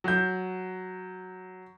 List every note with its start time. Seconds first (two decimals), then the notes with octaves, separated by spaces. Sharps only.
0.04 F#3 G6